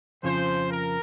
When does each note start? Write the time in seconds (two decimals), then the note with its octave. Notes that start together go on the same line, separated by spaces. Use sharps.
0.23 F2 C#3 F3 C5
0.69 A#4